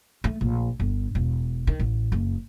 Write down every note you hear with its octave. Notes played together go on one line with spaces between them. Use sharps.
A3
A#1
G1
E1
D#3
A1
F#1